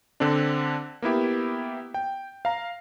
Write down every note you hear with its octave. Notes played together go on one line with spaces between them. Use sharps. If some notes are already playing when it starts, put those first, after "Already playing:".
D3 C4 D4
A#3 B3 E4 G4
G5
F5 A#5